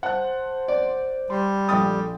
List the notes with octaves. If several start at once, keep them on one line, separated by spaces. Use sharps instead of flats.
C5 F#5 A5 F#6
D5
G3 C6
A#1 A4 G5 D#6 A6